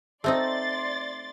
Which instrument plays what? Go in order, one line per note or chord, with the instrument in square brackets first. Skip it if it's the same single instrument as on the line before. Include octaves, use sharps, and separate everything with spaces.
[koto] A3 C4 D#4 [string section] D5 C6 A6